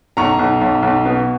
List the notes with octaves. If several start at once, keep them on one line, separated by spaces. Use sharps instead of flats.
B1 A#5 C#6
B1
B1
B1
B2